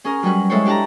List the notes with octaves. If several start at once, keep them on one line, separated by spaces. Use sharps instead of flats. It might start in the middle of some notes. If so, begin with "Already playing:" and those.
C#4 G#4 A#4
F#3 G3 C#4 B4
G#3 E4 A4 C5 C#5
D4 G4 B4 A5 A#5